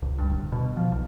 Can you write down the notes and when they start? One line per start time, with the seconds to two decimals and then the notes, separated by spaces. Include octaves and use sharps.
0.02 C#2
0.18 G2
0.30 D1
0.52 B2
0.77 F3
0.92 B1